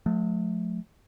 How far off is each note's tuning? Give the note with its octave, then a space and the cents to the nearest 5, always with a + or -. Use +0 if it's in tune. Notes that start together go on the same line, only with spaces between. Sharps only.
F3 +45 A3 -20